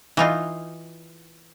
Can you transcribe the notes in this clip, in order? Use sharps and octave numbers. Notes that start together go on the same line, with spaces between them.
E3 D#4 F4